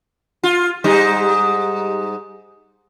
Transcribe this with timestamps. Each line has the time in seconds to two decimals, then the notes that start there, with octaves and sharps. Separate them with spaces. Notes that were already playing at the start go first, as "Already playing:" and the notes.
0.43 F4
0.84 G#2 G3 D#4